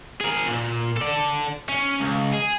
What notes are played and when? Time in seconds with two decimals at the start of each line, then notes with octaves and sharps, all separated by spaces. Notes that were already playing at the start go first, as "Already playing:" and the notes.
0.21 G#4 A#4
0.46 A#2
0.97 A4 D5
1.69 C#4
2.00 C#2
2.33 G#4